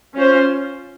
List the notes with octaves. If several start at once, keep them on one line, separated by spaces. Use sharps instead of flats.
C#4 F4 C5